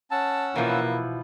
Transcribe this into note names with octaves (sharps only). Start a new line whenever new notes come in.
C#4 F#5 A5 E6
B2 E3 F3 A#3 E4